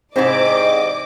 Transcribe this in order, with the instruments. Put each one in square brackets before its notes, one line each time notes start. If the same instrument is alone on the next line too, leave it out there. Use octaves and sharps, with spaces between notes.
[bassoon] G#2 [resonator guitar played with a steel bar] C3 E3 C4 [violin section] D5 D#5 D6